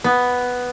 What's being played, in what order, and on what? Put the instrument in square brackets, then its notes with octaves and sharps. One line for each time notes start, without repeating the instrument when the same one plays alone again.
[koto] B3